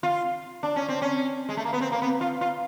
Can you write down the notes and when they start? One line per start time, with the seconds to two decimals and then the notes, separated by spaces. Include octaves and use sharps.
0.03 F4
0.63 D4
0.76 C#4
0.89 C4
1.02 C#4
1.49 G#3
1.57 A3
1.65 A#3
1.73 B3
1.81 C4
1.92 A#3
2.02 B3
2.21 F4
2.41 F4